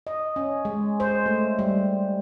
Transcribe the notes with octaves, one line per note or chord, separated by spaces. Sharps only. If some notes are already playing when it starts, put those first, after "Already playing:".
D#5
C#4
G#3
C5
A3
G3